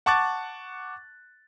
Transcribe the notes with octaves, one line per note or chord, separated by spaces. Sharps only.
F#5 A5 C#6 D6 F#6 A6